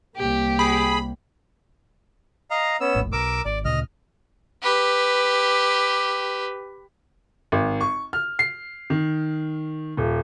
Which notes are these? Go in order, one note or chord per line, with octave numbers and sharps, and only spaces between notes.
C2 A#3 G4
G#4 B5
D#5 F5 A#5
B3 C#4 E6
F1 A#1 A2
B1 A#4 D6 E6
G#1 D5
D2 A#2 C#3 D#5 F6
G4 B4
G#1
C#6
F6
C7
D#3
D#1